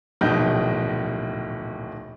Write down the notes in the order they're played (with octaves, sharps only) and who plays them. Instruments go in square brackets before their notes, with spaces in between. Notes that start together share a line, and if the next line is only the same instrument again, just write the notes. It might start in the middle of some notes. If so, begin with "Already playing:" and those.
[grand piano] D1 A#1 B2 D#3 D#5 G6